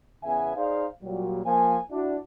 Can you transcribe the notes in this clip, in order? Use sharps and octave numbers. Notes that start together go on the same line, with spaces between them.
E2 C#3 B3 E5 G#5
D#4 G#4 C5 D5 F5
A#2 F#3 G3
F3 A#3 G#5
D4 E4 F#4